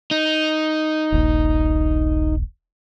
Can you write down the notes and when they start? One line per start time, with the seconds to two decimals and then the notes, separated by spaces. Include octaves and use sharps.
0.11 D#4
1.12 D#1 A#1